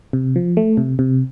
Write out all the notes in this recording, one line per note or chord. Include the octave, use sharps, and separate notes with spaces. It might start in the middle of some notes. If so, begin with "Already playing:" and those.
C3
F3
A3
C3
C3